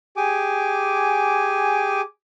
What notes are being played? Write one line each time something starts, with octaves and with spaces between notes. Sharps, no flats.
G4 G#4 G#5 D6